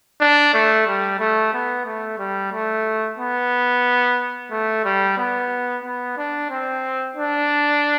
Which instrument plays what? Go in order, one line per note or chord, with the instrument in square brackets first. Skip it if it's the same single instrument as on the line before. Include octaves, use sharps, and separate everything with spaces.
[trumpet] D4
A3
G3
A3
B3
A3
G3
A3
B3
A3
G3
B3
B3
D4
C4
D4